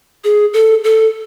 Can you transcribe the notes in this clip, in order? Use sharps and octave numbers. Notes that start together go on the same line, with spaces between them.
G#4
A4
A4